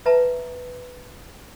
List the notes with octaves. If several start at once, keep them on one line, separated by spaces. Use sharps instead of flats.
B4 E5 A5 A#5